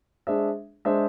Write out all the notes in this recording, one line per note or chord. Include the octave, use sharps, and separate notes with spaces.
G#3 D4 G#4 C5 E5
G#3 D4 G#4 C5 E5